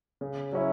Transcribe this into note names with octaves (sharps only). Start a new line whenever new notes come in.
C#3
F#3 C#4 E4